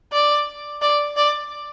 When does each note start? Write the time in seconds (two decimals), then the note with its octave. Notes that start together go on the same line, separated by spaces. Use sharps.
0.12 D5
0.82 D5
1.17 D5